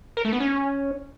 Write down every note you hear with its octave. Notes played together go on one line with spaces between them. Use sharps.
A#4
A3
B3
C#4